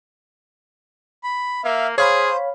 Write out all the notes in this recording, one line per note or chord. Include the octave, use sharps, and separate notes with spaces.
B5
A#3 E5 F5
G#4 C5 C#5 F5 B5